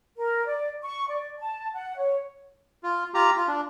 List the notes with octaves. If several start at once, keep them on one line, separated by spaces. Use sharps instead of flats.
A#4
D5
C#6
D5
A5
F#5
C#5
F4
F4 G4 A#5
F4
D4